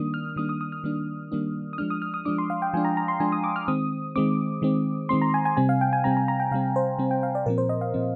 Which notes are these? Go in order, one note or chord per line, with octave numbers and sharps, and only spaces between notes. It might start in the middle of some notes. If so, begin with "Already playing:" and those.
Already playing: D#3 G3 A#3 D4 D#6
F6
D#3 G3 A#3 D4 D#6
D#6
D#6
F6
D#3 G3 A#3 D4
D#3 G3 A#3 D4
D#6
F3 G#3 D4 F6
D#6
F6
D#6
F3 G#3 D4 D6
C6
F5
G5
F3 G#3 D4 G#5
A#5
A#5
C6
F3 G#3 D4 G#5
D#6
D6
F6
D#3 G#3 C4 D#6
D#3 G#3 C4 D6
D#3 G#3 C4
D#3 G#3 C4 C6
A#5
G#5
G#5
C3 G3 C4 G#5
F5
G5
G#5
C3 G3 C4 A#5
A#5
A#5
G5
C3 G3 C4 F5
C5
C3 G3 C4
G5
F5
D5
A#2 F3 C4 A#4
C5
D#5
F5
A#2 F3 C4